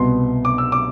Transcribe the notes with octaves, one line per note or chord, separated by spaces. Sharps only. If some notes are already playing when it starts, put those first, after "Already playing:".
Already playing: C2 B2 B3 C6
D6
E6
D6